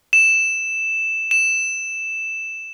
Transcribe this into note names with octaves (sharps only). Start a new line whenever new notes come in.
E7
E7